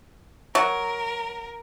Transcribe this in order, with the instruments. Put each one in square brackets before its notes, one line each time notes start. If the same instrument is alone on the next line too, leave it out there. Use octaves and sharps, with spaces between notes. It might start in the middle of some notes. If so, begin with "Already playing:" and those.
[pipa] F#3 [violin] A#4